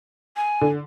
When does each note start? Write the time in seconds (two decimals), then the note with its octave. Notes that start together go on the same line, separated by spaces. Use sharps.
0.36 G#5
0.61 D3